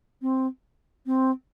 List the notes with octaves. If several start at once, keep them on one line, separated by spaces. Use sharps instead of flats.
C4
C4